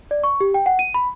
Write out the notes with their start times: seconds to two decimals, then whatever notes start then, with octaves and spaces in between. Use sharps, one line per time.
0.11 D5
0.24 C#6
0.41 G4
0.54 G5
0.66 F#5
0.79 D#7
0.94 B5